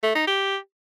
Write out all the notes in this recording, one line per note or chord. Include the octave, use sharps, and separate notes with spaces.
A3
D#4
G4